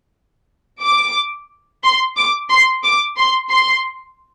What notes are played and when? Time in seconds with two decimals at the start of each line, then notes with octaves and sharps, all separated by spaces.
0.83 D6
1.83 C6
2.17 D6
2.50 C6
2.84 D6
3.18 C6
3.51 C6